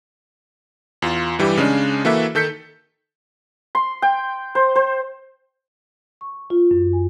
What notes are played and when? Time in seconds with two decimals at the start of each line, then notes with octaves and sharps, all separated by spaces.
1.02 E2 F4
1.39 G2 E3 G3 G4
1.57 C#3 G#3 C#4 D4
2.05 E3 A#3 F#4 A4 B4 E5
2.35 D#3 A4 G6 B6 C#7
3.75 C6
4.02 G5
4.55 C5
4.76 C5
6.21 C#6
6.50 F4
6.71 F#2
6.93 G#5